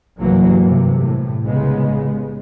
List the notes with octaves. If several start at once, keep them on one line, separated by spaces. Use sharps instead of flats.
C2 G2 E3 F#3 A#3
G2 C3
A2
C2 C#3 G#3 B3